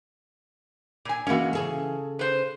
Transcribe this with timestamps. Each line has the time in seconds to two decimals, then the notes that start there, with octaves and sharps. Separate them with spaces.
1.05 A#2 G#5
1.27 E3 G#3 A#3 C#4 F#4
1.53 C#3 G#4 A4
2.19 B4 C5